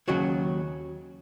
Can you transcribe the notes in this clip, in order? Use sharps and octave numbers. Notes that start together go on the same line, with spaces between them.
D#2 C#3 F#3 F#4